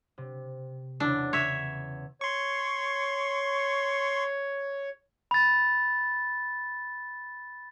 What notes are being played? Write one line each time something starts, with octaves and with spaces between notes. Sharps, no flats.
C3
E2 C#3 D4 E4
C#5 E5
C#5 C6 C#6
B5 A6